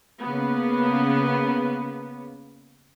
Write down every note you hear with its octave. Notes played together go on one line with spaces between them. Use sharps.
C#3 A#3 B3